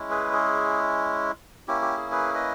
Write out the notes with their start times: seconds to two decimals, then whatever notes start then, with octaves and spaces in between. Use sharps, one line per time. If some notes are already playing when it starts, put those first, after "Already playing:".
Already playing: G#3 C#4 E4
0.10 G#4 B4
0.33 G#4
1.68 A#3 C#4 E4 G4
1.82 G4
1.97 G#4
2.12 G#4 B4
2.34 B4 D#5